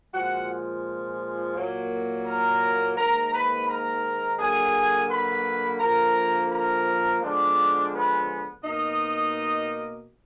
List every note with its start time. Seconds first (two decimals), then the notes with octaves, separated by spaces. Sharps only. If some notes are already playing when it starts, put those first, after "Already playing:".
0.14 A#2 F3 G#3 F#4 F#5
1.56 A#2 F#3 A#3
2.26 A#4 A#5
2.97 G#2 D#3 A#3 A#4 A#5
3.33 B4 B5
3.68 A#4 A#5
4.39 D3 F#3 A#3 G#4 G#5
5.10 B4 B5
5.80 D3 F3 A#3 A#4 A#5
6.52 A#4 A#5
7.22 D3 F3 G#3 B3 D4 D5
7.93 B3 B4
8.64 B2 A#3 D#4 D#5